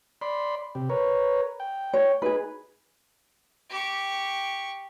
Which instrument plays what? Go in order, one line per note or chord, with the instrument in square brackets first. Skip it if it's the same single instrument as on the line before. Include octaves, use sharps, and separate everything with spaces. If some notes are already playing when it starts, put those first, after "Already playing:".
[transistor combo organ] D5 B5 C6
C3 G4
A#4 B4 C#5
G5
[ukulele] C#5
[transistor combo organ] D#4 [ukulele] G#4 B4
[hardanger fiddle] G4 C#6